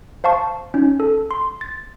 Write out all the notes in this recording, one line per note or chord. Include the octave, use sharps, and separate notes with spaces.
C5 F5 A5 C#6
C#4 D#4
A4
C6
A6